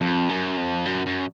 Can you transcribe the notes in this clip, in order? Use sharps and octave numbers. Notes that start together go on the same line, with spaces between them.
F2
F#2
F2
F#2
F#2